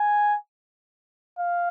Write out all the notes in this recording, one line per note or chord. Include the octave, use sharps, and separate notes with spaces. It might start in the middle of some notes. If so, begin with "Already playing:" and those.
Already playing: G#5
F5